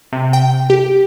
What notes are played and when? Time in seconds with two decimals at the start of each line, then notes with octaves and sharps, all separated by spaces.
0.13 C3
0.33 G5
0.70 G4